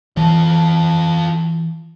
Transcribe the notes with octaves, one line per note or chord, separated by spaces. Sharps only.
E3 F4 A4